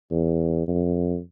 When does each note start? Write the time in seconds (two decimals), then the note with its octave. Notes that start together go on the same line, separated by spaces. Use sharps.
0.11 E2
0.68 F2